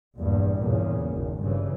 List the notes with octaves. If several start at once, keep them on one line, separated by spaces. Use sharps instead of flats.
A#1 E2 G2
E2 A#2 C#3
G#1
G2 C#3 E3